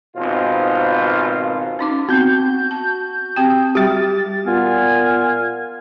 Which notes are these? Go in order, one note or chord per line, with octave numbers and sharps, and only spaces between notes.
G#1 B2 F4 C5
C#4 D#4 D6
B3 C4 F#4 G6
A5
C4 G4 G5
G3 F#4 G4 A6
A#2 B3 F4 F5 G#5